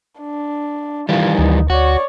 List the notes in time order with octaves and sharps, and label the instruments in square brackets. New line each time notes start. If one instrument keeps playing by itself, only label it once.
[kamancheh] D4
[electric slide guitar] D#3 E3 G3 [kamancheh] F4 G#5
[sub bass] D2 [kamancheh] D#4
[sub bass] D2 [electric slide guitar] F#4 [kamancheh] C#5 D5